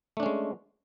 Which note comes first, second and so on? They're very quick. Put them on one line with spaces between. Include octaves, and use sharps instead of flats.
A3 D4 C#4 G#3